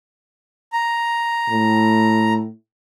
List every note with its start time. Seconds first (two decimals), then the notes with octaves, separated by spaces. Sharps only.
0.73 A#5
1.49 A2